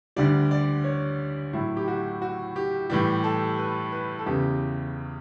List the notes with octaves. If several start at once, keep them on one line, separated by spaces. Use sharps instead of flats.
D2 D3 G3 D5
D5
C#5
A2 F#3 E4
G4
F#4
F#4
G4
A2 E3 G3 G4
A4
B4
B4
A4
E2 C#3 E3 G4